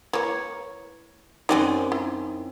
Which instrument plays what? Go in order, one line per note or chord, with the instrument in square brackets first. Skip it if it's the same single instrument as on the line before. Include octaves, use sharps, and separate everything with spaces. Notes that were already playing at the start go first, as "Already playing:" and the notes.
[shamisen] E3 A#3 [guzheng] C#5
[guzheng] F#2 C4 D#5 [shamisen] G3 D5 G#5 [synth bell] D#4
[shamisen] E4